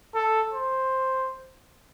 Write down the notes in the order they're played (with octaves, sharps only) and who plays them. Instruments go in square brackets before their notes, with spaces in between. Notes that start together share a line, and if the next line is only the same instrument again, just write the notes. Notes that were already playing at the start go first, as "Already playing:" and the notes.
[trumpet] A4
C5